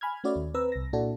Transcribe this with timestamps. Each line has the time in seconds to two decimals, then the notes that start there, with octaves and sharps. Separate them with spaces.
0.01 G#5 B5 F6 G#6
0.24 A3 C#4 F#4 D5 E5
0.36 D#2
0.54 C4 B4 A#5 E6
0.72 C2 A#6
0.93 A#2 D4 E4 F#4 A4